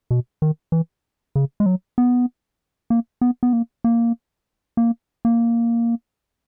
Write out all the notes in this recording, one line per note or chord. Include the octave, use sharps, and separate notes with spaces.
B2
D#3
E3
C#3
G#3
F#3
B3
A#3
B3
B3
A#3
A#3
A#3
A#3